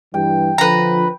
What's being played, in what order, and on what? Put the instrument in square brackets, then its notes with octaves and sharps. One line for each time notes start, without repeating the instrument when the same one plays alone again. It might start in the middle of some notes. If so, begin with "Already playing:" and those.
[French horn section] G2 E3 G3 [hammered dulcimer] G5
[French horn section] D3 F3 [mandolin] B4 A#5